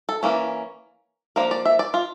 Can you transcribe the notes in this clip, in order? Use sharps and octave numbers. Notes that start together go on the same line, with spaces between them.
A4
E3 A#3 C#4
F3 A#3 D4 A#4
D5
E5
D5
F4